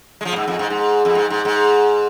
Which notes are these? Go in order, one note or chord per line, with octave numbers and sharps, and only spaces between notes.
G#3
F3
A#2
G#2
F2
G#2
G#2
F2
G#2
G#2
G#2